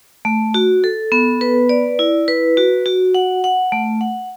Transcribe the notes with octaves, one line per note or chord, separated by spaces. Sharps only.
A3
F#4
A4
B3
B4
D5
E4
B4
F#4
F#4
F#5
F#5
A3
F#5